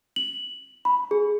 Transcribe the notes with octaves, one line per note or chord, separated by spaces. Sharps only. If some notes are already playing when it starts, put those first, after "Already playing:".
F#7
B5
G#4